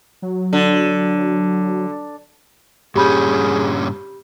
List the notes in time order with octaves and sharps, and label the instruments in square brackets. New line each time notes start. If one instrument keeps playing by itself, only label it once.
[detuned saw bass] F#3
[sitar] D3
[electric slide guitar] G2 A#2 C#4 [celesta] G4 B5 G6 [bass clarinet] G#4